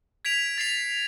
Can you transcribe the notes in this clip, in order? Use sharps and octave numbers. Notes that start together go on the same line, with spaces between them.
G#6 B6 D7 F7
A6 C7 F7